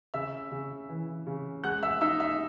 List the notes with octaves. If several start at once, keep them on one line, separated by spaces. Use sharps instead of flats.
C#3 E5 E6
C#3
E3
C#3
G#3 F#5 F#6
E5 E6
D#4 E5 E6
E5 E6